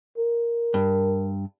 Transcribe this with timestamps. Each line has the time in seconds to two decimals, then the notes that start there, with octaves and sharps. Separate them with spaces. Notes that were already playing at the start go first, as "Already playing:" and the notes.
0.18 A#4
0.74 G2